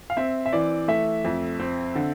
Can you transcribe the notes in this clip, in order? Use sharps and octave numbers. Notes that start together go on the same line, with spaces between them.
F5
C4 E5
E5
E3 D5
A3 E5
F2
C4
D3